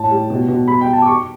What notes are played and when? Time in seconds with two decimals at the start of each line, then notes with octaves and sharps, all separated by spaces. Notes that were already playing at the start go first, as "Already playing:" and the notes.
Already playing: A2 A5
0.11 G3
0.30 B2
0.48 B2
0.67 G3 B5
0.81 G5
0.87 G3
0.93 A5
1.02 D6
1.06 G3 C#6